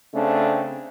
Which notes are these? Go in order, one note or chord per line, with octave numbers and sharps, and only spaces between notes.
C#3 A3 C4 D4